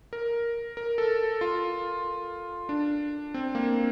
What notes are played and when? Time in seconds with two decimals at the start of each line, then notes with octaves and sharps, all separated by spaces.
0.13 A#4
0.77 A#4
0.98 A4
1.41 F4
2.69 D4
3.34 C4
3.55 A#3